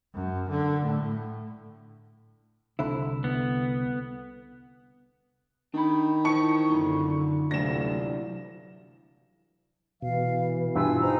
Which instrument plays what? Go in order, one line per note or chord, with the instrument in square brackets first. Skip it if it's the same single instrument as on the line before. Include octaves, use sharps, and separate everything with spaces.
[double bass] F#2
D3
A2
[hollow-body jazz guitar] C2 D3 E4
[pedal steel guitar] B3
[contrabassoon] D#3 [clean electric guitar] D4 B5
[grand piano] E3 C#6 C#7 [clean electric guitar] C5 A5
[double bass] F#2 D3 [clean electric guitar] D#4 F4
[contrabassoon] D2 [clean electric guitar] G2 E3 F4 [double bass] C3 F#3 [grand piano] A#6 E7
[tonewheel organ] B2 [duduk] E3 [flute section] F5
[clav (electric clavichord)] G2 E4 F4 [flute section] G#5 E6
[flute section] D#4 C5 A#5